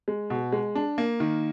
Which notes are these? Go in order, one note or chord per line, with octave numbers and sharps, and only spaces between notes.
G#3
B2
G#3
D4
A#3
D#3